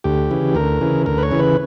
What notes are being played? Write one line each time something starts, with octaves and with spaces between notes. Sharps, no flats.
D2 G4
C#3 E3
D2 A#4
C#3 E3
D2 A#4
B4
C#5
C#3 E3
B4